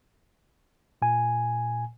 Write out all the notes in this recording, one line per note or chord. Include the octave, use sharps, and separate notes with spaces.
A#2 G#5